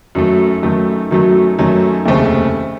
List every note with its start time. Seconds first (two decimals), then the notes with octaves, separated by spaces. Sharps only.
0.15 F#2 D#3 F#3 A3
0.62 F#2 D#3 F#3 A3
1.11 F#2 D#3 F#3 A3
1.59 F#2 D#3 F#3 A3
2.06 F1 D#2 C#3 A3 C4